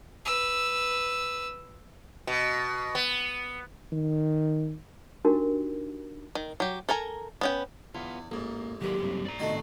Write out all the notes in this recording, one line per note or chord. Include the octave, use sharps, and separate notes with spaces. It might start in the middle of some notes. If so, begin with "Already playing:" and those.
B4 E6
B2
B3
D#3
D4 D#4 F#4 G4 A#4
D#3
F#3 G4
A4 A#4 G#5 A#5
B3 C#4 G5
E2 B3 F4
A1 G#2 A#3
D#2 F#3 A#3 G4 A#4 D5
G2 C4
D5 A#5
A2 C3 D#3 A3 F#4 D#5